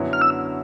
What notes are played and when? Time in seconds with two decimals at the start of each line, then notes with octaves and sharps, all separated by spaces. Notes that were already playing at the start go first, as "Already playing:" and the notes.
Already playing: F#2 D3 F#3 B3 E4
0.13 F6
0.22 E6